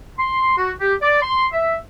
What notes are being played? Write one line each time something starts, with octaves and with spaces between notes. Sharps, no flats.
C6
F#4
G4
D5
C6
E5